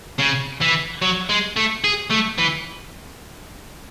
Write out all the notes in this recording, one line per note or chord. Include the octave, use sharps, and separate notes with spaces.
C#3
E3
F#3
G#3
A3
G#4
A3
E3